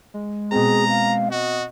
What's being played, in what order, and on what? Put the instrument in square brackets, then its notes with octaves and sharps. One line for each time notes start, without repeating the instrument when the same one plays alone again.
[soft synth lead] G#3
[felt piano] B2 C4 [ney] G#4 [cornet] A#5
[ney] F5
[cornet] F#4 [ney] D#5